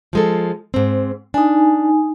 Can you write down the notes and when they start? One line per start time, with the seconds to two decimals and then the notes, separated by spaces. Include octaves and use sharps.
0.13 F3 G#3 A4
0.74 G#2 C4
1.34 D4 D#4 G#5